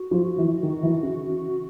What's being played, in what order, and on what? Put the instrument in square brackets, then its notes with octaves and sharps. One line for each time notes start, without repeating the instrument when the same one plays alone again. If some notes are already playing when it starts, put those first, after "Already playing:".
Already playing: [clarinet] F#4
[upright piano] F3
E3
D#3
E3
C#3